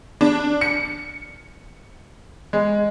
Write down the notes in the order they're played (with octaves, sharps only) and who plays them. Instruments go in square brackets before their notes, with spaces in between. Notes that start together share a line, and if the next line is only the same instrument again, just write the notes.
[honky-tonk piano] D4
C#7
G#3